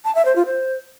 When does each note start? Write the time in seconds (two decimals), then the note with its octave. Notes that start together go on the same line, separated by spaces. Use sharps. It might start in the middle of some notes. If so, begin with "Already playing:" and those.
0.05 A5
0.15 E5
0.25 C5
0.36 F4
0.46 C5